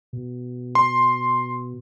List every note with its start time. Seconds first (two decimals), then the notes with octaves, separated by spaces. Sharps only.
0.13 B2
0.75 C6